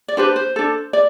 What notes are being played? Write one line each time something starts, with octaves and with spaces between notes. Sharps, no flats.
D5
D4 G4 B4 C5
C5
D4 A4
D5